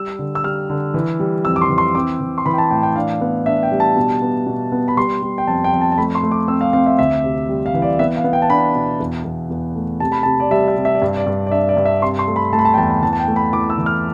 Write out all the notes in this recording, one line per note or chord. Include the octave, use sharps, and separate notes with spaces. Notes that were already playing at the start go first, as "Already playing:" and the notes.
Already playing: G3 E6
D3
E6
G3 F6
D3
E3
G3
F2 E6
D6
C6
E3
C6
C4 D6
E3
C6
E3 B5
G5
A5
A2 G5
G5
D4 F5
B3
D4 E5
G5
G3
A5
B2
B3
B2
B3
B5
G3 C6
G3
G5
F2 A5
G5
F2
A5
A5
A3 B5
C6
A3
D6
C4 E6
F5
C4 F5
E5
D2 E5
C3
G3
F5
E3
D5
B3 E5
F5
B3
G5
A5
D4 B5
B2
E2
E2
E2
A3
C3 A5
B5
C3 A5
D5
G3 E5
E5
C3
E5
D5
G2
D5
G2
D5
D4 E5
D5
G2
E5
C3 C6
C6
A3
B5
A3 A5
B5
A5
G5
E2 A5
B5
E3 A5
A5
G5
A3
B5
E3 D6
E6
E3
F6